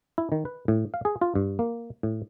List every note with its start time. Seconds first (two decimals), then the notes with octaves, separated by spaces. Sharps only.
0.18 E4
0.32 D#3
0.45 B4
0.68 A2
0.94 F5
1.05 G#4
1.21 F4
1.35 G2
1.59 A#3
2.03 A2